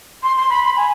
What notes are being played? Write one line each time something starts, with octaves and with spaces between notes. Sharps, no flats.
C6
C6
B5
B5
G#5